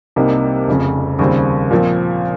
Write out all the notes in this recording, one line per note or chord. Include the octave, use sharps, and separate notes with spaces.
C2 C3 G3 A#3 D#4
F1 F2 C#3
D#2 C#3 G3 C4
A#2 F3 C4